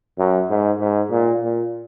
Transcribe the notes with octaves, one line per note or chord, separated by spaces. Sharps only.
F#2
G#2
G#2
A#2
A#2